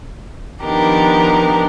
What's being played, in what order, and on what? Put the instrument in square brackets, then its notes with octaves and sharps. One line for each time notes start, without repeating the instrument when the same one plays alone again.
[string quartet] D#3 F3 B3 D4 G4 A#4